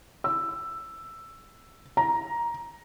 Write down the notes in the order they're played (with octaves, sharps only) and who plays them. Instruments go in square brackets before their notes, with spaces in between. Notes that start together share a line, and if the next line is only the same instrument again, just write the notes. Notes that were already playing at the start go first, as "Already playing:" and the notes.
[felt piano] E6
A#5